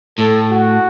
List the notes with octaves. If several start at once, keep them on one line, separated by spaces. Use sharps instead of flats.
A2 A4
F#4